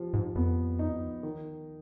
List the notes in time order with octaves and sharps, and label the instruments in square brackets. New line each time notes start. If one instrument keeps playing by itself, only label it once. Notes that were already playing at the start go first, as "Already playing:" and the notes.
Already playing: [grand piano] F3 G4
[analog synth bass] G#2
[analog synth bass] F2 [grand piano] B3
[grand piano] D#4
D#3